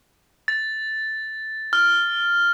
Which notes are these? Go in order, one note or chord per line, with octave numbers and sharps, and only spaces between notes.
A6
F6